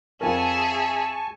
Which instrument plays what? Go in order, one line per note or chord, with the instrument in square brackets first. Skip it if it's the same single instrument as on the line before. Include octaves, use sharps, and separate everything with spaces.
[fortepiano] F2 A#4 [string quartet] G#4 E5 [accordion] G#5 A5 C#6